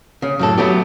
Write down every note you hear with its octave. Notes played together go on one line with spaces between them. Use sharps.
C#3
F#2 A2 A4
F#3 A3 B3 G4